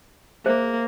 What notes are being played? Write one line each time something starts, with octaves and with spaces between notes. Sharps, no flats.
A#3 G#4 C5 E5